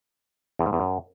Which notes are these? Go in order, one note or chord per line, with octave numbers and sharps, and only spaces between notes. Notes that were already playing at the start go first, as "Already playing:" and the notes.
E2
G#2
E2
F#2